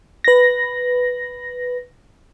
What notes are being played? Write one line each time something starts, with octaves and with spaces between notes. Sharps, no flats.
B4 A#6